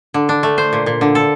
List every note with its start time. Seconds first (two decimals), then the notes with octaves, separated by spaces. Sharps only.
0.14 D3
0.29 D4
0.43 A3
0.58 C5
0.73 A#2
0.86 A#2
1.01 D3
1.15 A4